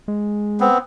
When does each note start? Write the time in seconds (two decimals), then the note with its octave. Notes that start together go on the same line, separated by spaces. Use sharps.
0.08 G#3
0.60 B3 C4